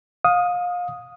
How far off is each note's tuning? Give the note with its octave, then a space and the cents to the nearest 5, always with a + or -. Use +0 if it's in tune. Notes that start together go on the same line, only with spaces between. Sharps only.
F5 +30 D#6 +0